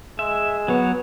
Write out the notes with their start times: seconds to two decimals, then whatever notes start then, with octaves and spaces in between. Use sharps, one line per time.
0.19 G#3 E5
0.68 F#3 B3 C#5